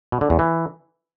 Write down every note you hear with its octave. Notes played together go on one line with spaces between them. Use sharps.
B2
D3
E2
E3